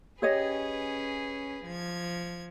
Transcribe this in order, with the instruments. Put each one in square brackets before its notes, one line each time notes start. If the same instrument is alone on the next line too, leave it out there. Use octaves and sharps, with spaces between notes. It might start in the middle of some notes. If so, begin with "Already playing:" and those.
[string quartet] C#4 G#4 B4 [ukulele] G4 C#5 D#5
[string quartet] F3 G#6